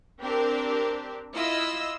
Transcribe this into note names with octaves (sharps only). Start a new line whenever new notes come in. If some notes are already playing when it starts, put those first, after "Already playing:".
C4 D4 G4 A#4
E4 F4 D#5 E6